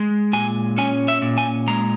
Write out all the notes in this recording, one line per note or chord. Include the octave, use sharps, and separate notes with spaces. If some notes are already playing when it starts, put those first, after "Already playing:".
Already playing: G#3
A#2 G#5
C#4 G#5
E5
A#2
G#5
G#3 A#5